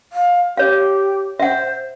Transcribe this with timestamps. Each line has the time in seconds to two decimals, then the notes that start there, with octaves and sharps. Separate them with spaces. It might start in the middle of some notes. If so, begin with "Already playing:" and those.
0.13 F5
0.57 G4 C#5 F5
1.40 C5 E5 F#5